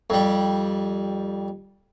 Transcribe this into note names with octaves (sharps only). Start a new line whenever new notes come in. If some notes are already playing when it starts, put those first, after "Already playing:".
F2 G3